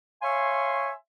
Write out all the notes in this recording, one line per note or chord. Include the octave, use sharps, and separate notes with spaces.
C#5 E5 F5 G#5 C6 C#6